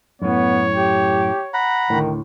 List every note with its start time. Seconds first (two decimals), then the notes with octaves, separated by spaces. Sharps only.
0.22 F#2 A2 B3 C#5
0.75 G4
1.54 F#5 A#5 B5
1.90 D2 A2 D#3